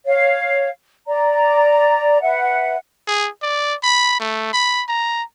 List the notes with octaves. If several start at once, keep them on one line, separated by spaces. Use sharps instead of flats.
C#5 F5
D5 A#5
B4 E5 F#5
G#4
D5
B5
A3
B5
A#5